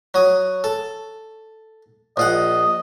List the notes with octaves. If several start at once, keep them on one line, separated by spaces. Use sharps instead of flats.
F#3 D#6
A4
A#1 F4 D#5 F#5